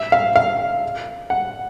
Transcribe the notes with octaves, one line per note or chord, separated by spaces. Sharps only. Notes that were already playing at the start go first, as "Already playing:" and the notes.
Already playing: E5
F5
F5
F#5